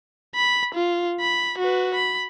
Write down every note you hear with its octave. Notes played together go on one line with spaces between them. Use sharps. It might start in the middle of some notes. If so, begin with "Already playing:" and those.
B5
F4
B5
F#4 B4
B5